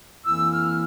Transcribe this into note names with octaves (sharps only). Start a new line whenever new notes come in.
F2 E3 A#3 E4 E6
F6